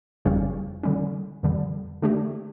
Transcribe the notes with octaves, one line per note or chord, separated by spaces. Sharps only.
G1 F2 C#3 G3 C#4
D3 G3 C#4
F2 D3 G3
D3 A3 D4 G4